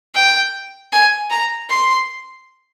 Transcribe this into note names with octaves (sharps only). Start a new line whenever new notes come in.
G5
G#5
A#5
C6